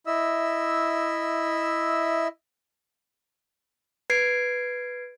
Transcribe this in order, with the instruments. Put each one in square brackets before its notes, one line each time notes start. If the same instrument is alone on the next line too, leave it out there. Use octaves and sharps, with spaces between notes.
[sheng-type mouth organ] E4 D#5 E5 E6
[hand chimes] B4 G#6 C7 D7